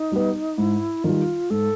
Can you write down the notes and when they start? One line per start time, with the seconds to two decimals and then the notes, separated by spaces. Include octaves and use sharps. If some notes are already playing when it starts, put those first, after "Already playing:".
Already playing: D#4
0.12 G3 B3
0.58 G#2 E4
1.04 D#3 G3 F4
1.50 G#2 A4